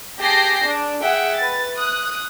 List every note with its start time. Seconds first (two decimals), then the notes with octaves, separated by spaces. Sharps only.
0.19 G4 G#4 A5 G6 A#6 C7
0.65 D4
1.02 G#4 E5 F#5 G5
1.36 B4 A6
1.76 D#6 F#6